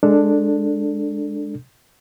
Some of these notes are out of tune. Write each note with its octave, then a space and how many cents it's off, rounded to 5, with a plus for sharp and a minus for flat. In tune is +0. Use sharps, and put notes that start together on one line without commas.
G#3 +0 D4 +0 A4 +10